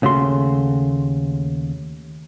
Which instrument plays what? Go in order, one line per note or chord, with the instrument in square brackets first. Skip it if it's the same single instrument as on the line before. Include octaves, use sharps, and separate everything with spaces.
[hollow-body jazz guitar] D#2 C#3 A3 F#4 C6